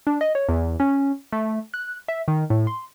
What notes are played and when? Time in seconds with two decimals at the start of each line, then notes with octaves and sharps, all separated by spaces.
0.07 D4
0.21 D#5
0.35 C#5
0.49 E2
0.80 C#4
1.33 A3
1.74 F#6
2.08 E5
2.28 D#3
2.50 A2
2.67 C6